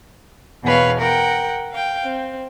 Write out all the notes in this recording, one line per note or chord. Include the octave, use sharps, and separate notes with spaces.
E2 B2 B4 C#5 F5
A#4 F#5 G5
F5 G5
C4